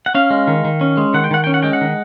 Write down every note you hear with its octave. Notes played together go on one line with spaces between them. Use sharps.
F#5
C#4 F5
G#3
D#3
D#3
C#4
G#3
D#3 F#5
G5
D#3 F#5
C#4 G5
F#5
G#3 G5
F#5
D#3